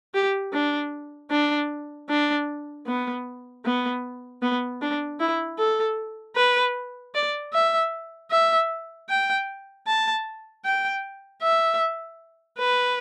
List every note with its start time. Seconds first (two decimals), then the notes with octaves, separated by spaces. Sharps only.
0.14 G4
0.53 D4
1.31 D4
2.09 D4
2.87 B3
3.65 B3
4.42 B3
4.82 D4
5.20 E4
5.59 A4
6.36 B4
7.15 D5
7.53 E5
8.31 E5
9.09 G5
9.87 A5
10.65 G5
11.42 E5
12.59 B4